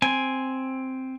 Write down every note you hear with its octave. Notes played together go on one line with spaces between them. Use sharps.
C4 G#5